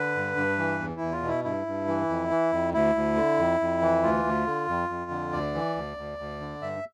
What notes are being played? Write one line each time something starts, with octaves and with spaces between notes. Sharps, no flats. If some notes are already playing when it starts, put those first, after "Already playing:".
Already playing: D3 B4
G2
G2
E3
E2
E4
E2
F4
B2
E4
G2 E4
G2
E3
F2
E3
F2
D2 E4
D2
D3
F2
F2
E3
D2 F4
D2
D3
F2
F2
D3
D2 D5
E3
D2
D2
D2
D3
G2 E5